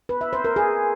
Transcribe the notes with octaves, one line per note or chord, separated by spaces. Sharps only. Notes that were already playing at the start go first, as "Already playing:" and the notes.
B4
E5
C5
A#4
G#4